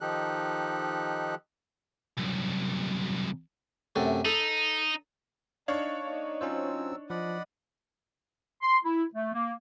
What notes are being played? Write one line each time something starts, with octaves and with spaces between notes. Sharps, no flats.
D#3 F3 D#4 G4 A4 F#6
C2 F#2
F#2 C3 A3
D#4 A4 B5
D4 D#4 C#5 F5
A#3 D#4
F#3 C4 C#4 F4 C5 E6
F3 D5 D#5 F#5 B5
C6
E4
A3
A#3